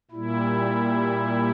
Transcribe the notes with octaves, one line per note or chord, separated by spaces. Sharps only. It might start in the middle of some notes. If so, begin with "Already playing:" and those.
A#2 G3 E4